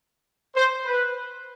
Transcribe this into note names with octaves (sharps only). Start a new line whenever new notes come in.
C5
B4